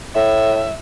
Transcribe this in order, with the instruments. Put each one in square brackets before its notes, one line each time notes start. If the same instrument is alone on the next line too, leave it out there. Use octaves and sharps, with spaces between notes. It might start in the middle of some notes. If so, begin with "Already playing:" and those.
[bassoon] A2 [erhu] E5